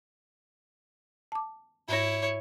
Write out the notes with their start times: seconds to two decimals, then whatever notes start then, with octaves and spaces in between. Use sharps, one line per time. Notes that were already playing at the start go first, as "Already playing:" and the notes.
1.32 A5 D6
1.89 G#2 E4 C#5 A#6